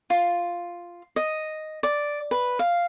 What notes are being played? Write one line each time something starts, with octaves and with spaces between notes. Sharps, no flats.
F4
D#5
D5
B4
F5